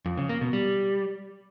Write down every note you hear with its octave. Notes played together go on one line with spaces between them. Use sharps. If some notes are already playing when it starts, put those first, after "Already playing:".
F2
C#3
A#3
B2
G3